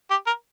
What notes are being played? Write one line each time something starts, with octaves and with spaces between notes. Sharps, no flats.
G4
A#4